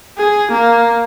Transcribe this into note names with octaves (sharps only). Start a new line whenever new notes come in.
G#4
A#3